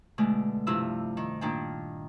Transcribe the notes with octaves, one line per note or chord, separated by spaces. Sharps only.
B2 D3 G#3 A3
G2 C3 F3 E4 E6
D#3
A#2 D#3 D4 G5